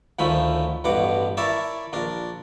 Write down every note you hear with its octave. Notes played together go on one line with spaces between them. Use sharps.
D2 D#3 F3 A3 C#4 B5
A1 G2 B2 F#5 D6
E4 A#4 C#5 D5 E5 A5
A#1 D4 A#4